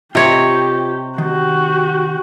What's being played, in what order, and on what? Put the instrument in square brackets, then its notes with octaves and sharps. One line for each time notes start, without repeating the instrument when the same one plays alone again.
[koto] C3 C#5 [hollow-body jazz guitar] F4 C5 D#5 [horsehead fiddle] G4
[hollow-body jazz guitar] D#3 [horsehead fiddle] F#4 G4